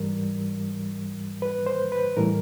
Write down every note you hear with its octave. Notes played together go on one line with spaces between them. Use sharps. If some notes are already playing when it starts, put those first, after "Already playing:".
Already playing: G#2 E3 G3 A#4
B4
C5
B4
A2 E3 G3 A#4